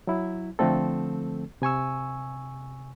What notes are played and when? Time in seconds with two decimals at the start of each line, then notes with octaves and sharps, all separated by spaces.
0.07 F#3 E4
0.59 D3 F3 A3 C4 A4
1.62 C3 G#5 C#6 E6